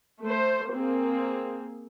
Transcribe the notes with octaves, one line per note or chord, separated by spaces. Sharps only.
A3 C5
A#3 C4 G#4